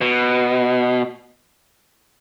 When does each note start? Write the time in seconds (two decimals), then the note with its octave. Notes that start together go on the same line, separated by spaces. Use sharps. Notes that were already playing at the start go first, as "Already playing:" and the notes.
0.01 B2